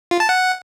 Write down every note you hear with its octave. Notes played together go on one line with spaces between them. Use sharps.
F4
A5
F#5